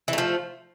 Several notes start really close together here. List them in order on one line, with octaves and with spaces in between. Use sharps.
E3 A3 F3